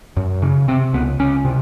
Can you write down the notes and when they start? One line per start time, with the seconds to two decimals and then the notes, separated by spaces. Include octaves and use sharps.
0.17 F#2
0.42 C#3
0.68 C3 C4
0.93 C#2 B3
1.19 C#2 C#4
1.45 C3